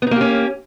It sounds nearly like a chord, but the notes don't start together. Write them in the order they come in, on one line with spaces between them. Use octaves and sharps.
B3 D#4 A#3 G4 C#4